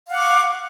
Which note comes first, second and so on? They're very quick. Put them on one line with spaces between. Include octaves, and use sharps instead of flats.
F5 F#5 D6 C#6